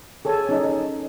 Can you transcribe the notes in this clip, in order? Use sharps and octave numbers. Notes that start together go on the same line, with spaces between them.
G#4 A4 C#5 G#5 A5
C#4 D#4 D#5